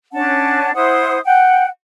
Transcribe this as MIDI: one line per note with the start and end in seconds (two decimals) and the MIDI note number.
0.13 0.73 61
0.13 0.73 62
0.13 0.73 78
0.13 0.73 81
0.74 1.18 64
0.74 1.18 72
0.74 1.18 78
0.74 1.18 87
1.24 1.66 78
1.24 1.66 79